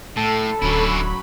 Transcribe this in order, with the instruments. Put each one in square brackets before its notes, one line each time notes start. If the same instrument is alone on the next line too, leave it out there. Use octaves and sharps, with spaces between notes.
[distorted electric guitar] A2 [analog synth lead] A4
[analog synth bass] D1 [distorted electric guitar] D3 E4 [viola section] F#3 C#4 B5